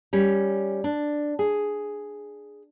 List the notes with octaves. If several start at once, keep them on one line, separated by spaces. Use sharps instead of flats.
G3 C#4
D4
G#4